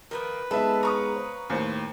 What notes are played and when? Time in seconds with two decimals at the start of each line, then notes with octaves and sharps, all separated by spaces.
0.11 D#3 F3 A#3 A#4 B4
0.51 G#3 B3 D#4 A4 E5 A5 B5
0.83 C#5 F5 A#5 C#6 D#6
1.16 C5
1.50 D#2 A2 C5 C7 C#7